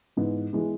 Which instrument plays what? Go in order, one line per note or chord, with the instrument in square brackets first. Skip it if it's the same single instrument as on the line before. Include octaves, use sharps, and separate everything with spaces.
[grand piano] G#2 E3 B3
E3 G#3 B3